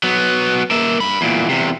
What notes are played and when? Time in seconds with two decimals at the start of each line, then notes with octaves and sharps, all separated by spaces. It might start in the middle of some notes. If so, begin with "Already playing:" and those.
0.03 F#3 B3
0.71 A#3 E5
1.00 G2 B5
1.21 E2 A#2
1.49 E2 C3